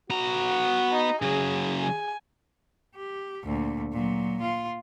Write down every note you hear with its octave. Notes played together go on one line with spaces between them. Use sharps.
B3 F#4 A#5
D#4
C#3 F#3 G#4
G#4 G#5
G4
D2 A#2
A#2 F#3
F4